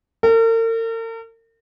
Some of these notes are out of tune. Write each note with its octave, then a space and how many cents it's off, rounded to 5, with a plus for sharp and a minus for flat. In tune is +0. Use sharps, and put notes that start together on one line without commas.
A#4 -45